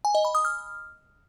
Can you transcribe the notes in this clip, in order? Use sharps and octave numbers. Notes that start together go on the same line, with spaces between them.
G#5
D#5
B5
D#6
F6